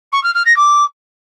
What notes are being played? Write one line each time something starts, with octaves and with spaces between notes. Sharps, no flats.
C#6
F6
F6
A#6
D6